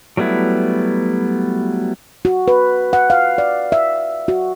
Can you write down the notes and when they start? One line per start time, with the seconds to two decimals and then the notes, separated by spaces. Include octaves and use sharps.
0.17 F#3 G3 A3 B3 E4
2.25 F#4
2.48 B4
2.93 F#5
3.10 F5
3.38 D5
3.72 E5
4.28 F#4